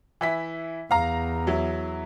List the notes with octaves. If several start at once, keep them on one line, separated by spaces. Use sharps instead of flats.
E3 E4 B6
E2 F5 A#5
F#3 E4